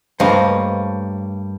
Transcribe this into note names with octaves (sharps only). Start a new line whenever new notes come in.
G2 A3 A#3 C5 C#5 D#5 F5